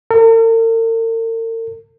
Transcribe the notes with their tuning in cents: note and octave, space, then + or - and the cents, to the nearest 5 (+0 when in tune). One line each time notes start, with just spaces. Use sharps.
A#4 -45